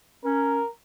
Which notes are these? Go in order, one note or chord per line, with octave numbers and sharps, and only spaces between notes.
C#4 A#4